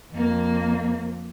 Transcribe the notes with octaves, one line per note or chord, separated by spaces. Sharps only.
F2 A#3